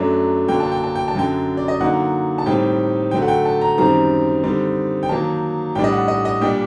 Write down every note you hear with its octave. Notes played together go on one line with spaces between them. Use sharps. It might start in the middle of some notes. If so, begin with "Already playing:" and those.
Already playing: F#2 F#3 A3 D4
D3 F#3 A#3 G5
A5
G5
A5
G5
A5
F#2 D3 F#3 G5
D5
D#5
D3 F#3 A#3 D#4 F#5
A5
A2 G3 C4 D#4 G5
D3 F#3 A3 G5
F#5
G5
A5
A#5
F#2 D#3 G3 C4 D#4 A#5
D3 G3 C4 D#4
G5
D#3 F#3 A#3 D#4 A5
A2 G3 D4 G5
D#5
F#5
D#5
D#5
A#2 G3 D4 G5